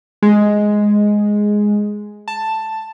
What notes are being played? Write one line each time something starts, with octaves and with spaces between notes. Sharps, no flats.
G#3
A5